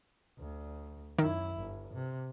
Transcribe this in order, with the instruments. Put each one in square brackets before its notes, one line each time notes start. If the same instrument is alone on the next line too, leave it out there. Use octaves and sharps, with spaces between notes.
[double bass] D2
[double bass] F#2 E4 [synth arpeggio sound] D#3
[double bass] G1
C3